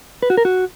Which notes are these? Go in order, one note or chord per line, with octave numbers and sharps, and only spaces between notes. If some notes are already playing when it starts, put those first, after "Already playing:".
B4
F#4
A#4
F#4